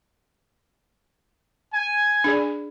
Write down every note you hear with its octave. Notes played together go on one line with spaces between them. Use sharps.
G#5
D4 G#4 D5